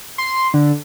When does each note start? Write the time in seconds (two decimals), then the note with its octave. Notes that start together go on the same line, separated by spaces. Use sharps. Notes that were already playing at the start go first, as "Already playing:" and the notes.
0.18 C6
0.54 D3